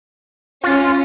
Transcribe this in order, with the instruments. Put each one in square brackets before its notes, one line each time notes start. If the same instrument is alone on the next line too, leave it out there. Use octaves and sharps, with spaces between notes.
[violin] C#4 [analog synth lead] F4